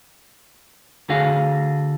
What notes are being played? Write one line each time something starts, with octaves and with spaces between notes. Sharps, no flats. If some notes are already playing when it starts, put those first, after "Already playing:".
D3 F#4 G#4 F5